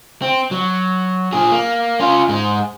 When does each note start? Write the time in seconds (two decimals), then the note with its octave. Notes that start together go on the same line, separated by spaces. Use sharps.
0.22 C4
0.51 F#3
1.33 A#2 G#4
1.51 A#3
2.00 C#4 F4
2.29 G#2 G#3